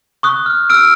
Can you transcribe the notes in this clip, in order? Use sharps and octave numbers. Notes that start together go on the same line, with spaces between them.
C#6 D#6 F#6
F6
E6 F6 D7